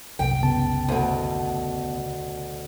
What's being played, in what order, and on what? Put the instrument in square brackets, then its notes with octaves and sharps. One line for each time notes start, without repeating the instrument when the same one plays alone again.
[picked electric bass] F#1 C2 [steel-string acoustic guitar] G5
[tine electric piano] C#3 B3 A5
[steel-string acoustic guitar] D2 B2